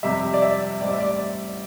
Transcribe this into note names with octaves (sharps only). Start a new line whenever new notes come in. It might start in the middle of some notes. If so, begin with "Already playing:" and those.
F2 C3 G3 E5
D5
E5
A1 A2 G3 C4 D5
E5
D5